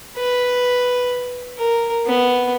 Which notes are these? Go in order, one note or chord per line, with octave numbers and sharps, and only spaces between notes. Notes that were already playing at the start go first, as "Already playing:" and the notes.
B4
A#4
B3